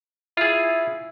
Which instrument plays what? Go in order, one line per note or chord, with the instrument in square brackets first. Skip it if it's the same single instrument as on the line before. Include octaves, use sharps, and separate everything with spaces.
[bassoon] E4 [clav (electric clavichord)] F4 G#4